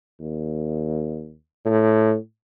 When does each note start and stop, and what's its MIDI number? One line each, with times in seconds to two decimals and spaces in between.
0.20 1.34 39
1.65 2.16 45